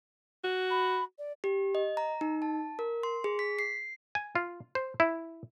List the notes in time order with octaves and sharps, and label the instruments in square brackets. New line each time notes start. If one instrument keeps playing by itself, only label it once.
[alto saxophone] F#4
[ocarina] B5
D5
[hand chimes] G4
D#5
A#5
D#4
A5
A#4
C6
G#4
B6
C7
[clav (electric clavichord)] G#5
F4
C5
E4